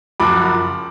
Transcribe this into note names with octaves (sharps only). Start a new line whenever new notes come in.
F#1 F#2 F3 B5 D6